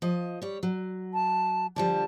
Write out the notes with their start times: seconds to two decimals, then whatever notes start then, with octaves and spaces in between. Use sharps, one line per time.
0.02 F3 D#5
0.42 G3 C#5
0.63 F#3
1.14 A5
1.76 D3 F3 G3 A5